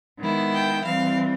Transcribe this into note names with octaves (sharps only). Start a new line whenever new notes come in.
D#3 G#3 B3 E4
G5
E3 G3 C4 F5